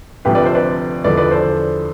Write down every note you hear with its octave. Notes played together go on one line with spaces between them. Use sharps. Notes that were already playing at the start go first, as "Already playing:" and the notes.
D2 C3 F3 G4 B4
B4 D5
A4 C5
B4 D5
E2 D3 F3 B4 D5
B4 D5
A4 C5